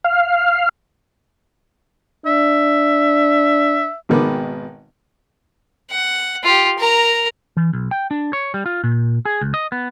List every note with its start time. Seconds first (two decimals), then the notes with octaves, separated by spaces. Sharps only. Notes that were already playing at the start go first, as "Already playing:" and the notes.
0.04 F5
2.26 D4 E5
4.09 G#1 B2 D#3 B3 B4 D6
5.91 F#5
6.44 F4 G4
6.78 A#4 A#5
7.57 E3
7.73 B1
7.91 G5
8.11 D4
8.33 C#5
8.54 G3
8.66 F4
8.84 A#2
9.25 G#4
9.41 C#2
9.54 D#5
9.72 B3